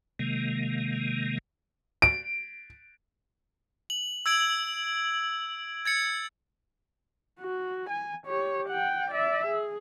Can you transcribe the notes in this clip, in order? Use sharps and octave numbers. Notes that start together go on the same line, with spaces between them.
C3 D#3 G#3 A#3
D7
F#7
E6 G#6 D7 F#7
G#6 A6 C#7
F#4
G#5
G4 C#5
F#5 G5
D5 E5
G#4